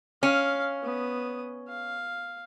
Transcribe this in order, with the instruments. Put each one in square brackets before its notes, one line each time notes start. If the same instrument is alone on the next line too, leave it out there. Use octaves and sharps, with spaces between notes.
[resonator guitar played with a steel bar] C#4 [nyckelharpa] F5
[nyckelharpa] B3 D#6
F5